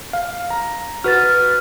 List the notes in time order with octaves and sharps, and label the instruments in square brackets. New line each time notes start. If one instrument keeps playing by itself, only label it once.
[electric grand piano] F5
A#5
[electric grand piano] F#4 B4 [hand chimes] F6 A6